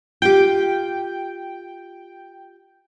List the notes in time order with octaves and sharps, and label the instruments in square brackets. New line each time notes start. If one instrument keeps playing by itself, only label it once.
[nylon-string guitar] F4 G4 [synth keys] G5